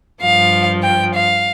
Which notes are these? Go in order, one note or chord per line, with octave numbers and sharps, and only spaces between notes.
G2 F3 F5
G5
F5